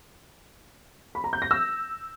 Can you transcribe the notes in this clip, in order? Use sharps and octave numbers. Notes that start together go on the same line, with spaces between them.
B5
A#5
G6
A#6
E6